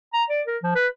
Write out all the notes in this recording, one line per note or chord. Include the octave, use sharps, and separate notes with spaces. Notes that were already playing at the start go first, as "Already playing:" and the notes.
A#5
D5
A#4
F3
B4